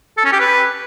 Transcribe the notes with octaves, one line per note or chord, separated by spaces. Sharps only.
A4
C#4
G4
B4